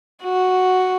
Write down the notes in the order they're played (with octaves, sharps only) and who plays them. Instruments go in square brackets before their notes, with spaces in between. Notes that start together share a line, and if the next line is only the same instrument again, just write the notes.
[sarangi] F#4